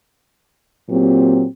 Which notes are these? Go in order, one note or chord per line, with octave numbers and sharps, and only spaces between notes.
A#2 F#3 C4 G4